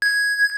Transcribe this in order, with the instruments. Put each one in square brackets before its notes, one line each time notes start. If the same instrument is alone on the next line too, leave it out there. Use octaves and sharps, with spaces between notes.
[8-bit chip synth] G#6